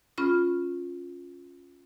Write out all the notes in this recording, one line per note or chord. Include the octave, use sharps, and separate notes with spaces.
C#4 F4 B5 F6